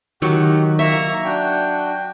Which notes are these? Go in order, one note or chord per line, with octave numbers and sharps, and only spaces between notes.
D#3 F#3 F#4 G4
A#3 E5 A#5 C#6
D4 F#4 G5